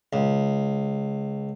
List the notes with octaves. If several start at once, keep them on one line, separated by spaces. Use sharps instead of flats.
C#2